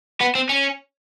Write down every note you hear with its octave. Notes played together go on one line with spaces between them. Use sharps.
B3
C4
C#4